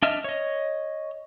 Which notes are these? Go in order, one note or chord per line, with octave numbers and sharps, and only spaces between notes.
D4 D#5 E5 F6
C#5 D#5